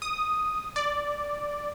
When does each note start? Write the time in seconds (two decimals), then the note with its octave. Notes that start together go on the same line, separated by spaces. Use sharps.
0.02 D#6
0.76 D5